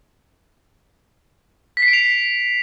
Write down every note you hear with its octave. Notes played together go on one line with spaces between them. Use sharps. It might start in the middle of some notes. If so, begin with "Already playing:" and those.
B6
C7
D7
F7